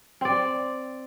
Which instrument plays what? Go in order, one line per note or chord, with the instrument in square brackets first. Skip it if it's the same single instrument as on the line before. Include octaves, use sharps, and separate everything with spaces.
[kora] C4 D5